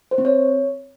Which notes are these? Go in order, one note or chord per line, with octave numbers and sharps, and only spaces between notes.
C5
C4
C#5